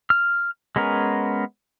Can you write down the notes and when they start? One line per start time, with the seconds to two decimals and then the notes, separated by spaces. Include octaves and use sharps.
0.10 F6
0.76 G#3 B3 C#4 A#4